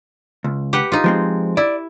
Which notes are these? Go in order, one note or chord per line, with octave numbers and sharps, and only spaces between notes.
C#2
G4 B4 F#5
D#4 F4
F3 G#3 C4
E4 D5